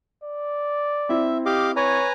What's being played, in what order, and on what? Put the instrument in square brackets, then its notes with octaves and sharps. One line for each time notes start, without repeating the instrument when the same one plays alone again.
[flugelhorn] D5
[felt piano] C4 E4 [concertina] E5
[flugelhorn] G4 [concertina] D#5 F5 D6
[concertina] B4 G#5 A#5 [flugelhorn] C#5